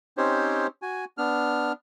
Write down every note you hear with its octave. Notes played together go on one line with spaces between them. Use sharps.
C4 C#4 D#4 G4 C5 C#5
F#4 G#5
B3 D4 F6